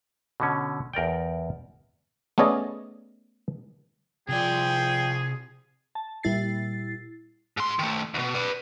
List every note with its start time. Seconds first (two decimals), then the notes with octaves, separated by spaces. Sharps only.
0.40 B2 D3 C#4
0.93 E2 A#4 D5 G5
2.38 A3 B3 C#4 G#4 D5 D#5
4.29 C3 F3 G#4 D5 G5
5.95 A5
6.23 A#2 G3 E4 A6 C7
7.57 G#2 C6
7.79 D#3 A3
8.14 D2 B2
8.35 B4 D5